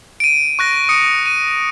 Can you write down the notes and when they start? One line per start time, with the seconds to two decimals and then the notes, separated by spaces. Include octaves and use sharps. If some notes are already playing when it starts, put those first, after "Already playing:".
0.20 D7 D#7
0.59 C#6 F#6 A#6
0.89 D#6 C#7
1.26 D#7